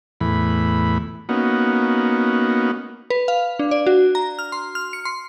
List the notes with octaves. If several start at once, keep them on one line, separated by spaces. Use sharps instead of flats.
E2 A2 E3 B5
A#3 B3 C#4 D#4 F#4
B4
F5
D4
D5
F#4
A#5
F6
C6
F6
C#7
C6